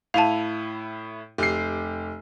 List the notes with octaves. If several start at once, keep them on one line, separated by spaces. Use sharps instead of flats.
A2 E4 F5 A5 D#7 F7
F1 G4 C7